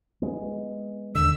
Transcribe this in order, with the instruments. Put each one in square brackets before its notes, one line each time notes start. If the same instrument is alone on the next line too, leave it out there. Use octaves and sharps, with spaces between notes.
[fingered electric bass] G#3 B3
[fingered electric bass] D#2 D3 [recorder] E6